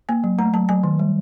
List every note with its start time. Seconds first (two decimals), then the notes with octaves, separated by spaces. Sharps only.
0.09 A#3 G#5
0.24 F#3
0.38 A3 A#5
0.53 F#3 A5
0.69 F#3 G#5
0.83 D#3
0.99 G3